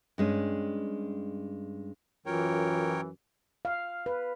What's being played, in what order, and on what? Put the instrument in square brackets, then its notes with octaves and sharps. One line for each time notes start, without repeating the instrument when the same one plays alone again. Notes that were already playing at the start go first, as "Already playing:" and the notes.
[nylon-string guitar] G2 G#3 C#4
[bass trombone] F#2 [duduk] E3 [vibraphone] F4 [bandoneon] A#4 C#5 G5
[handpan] F5
B4